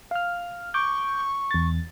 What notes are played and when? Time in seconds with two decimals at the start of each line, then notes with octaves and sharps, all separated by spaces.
0.11 F5 F6
0.74 C#6 D6 G6
1.51 E2 A6